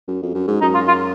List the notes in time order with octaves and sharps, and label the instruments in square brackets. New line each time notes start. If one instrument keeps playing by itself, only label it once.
[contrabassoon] F#2
F2
F#2
G#2
[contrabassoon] F#2 [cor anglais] D#4
[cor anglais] F4
F4